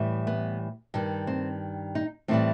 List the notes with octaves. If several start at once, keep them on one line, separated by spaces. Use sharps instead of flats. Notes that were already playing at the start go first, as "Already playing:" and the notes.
Already playing: A2 E3 G3
B3
G2 D#3 G3
C4
D#4
A2 E3 G3 C4